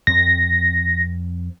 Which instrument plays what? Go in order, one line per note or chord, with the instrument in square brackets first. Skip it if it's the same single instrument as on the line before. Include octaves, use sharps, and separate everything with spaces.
[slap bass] F2 C4 [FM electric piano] A#6